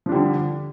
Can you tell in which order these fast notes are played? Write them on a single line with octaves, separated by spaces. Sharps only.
F3 D4 G3 D3